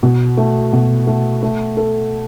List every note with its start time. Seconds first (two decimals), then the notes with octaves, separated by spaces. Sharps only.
0.03 B2
0.37 A3
0.73 B2
1.07 A3
1.43 A3
1.77 A4